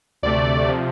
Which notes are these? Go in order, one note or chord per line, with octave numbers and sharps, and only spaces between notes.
D2 C3 A3 D5
C3 F3